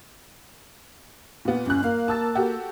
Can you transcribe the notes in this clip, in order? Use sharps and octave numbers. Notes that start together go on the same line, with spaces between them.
A#2 B3
G1 C#4 F#6
A#3 F5
A5 E6 A6
F#4 G4 A4